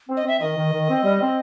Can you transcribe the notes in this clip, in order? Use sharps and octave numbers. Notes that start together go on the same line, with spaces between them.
C4
D#5
C4 E5
D#3 D#5
D#3
D#3
C4
G3
C4